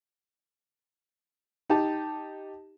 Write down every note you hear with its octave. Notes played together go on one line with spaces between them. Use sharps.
D#4 G4 A5